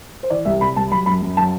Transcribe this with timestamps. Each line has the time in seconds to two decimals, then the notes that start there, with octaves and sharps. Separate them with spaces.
0.23 C5
0.30 E3 D5
0.45 C2 E5
0.61 C3 B5
0.76 C2 A5
0.92 F#3 B5
1.06 F#2 B5
1.22 F#2
1.37 F#3 A5